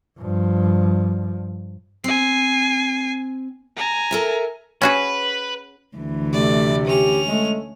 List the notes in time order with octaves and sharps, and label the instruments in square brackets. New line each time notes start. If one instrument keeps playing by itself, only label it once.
[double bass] G2 F3
[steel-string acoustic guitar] C4 [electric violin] G#5 C7
[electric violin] G#5 A#5
[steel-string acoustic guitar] A4 A#4 E5
[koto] C#4 F#4 G#4 [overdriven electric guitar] B4
[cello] D2 E3
[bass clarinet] C3 [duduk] A3 [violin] D5
[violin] C#4 F7 [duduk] G4
[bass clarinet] G#3 [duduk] A3